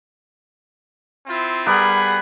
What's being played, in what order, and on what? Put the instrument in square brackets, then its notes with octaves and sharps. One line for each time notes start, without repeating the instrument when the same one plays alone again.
[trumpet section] C4 E4 F4
[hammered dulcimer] G3 B3 A#4 [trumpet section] G#4 F#5 B5